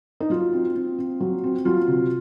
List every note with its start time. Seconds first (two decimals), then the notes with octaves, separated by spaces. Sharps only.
0.20 D#4
0.30 F#3 F4
0.53 C4
0.75 C4
0.98 C4
1.20 F#3
1.44 C4
1.65 F#3 F4
1.88 C3